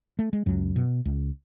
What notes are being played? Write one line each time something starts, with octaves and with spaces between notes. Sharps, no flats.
A3
G#3
C#2 F#2 F#3
B2
C#2